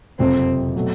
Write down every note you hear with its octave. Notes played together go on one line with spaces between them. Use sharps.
F#1 F2 C3 F3 C4
B2 F#3 A3